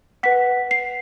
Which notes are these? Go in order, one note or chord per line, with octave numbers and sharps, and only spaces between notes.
B4 F#5 B6
C7